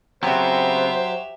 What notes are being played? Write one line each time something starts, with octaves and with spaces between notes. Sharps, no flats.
C#3 F#3 B3 C4 G4 C5 E5